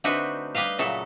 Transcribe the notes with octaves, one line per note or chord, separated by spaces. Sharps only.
D3 A3 C4 D#4 F#4 B4
G3 B4 D#5 F5
A#2 C#3 F#3 A3 A4